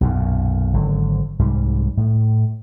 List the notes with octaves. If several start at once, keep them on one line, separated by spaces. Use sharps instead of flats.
B1 F#2 A#2
G#1 D3 F#3
C2 G#2 G3
A2